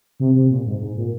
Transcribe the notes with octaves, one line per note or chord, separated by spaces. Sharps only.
C3
C3
A#2
G#2
G#2
A#2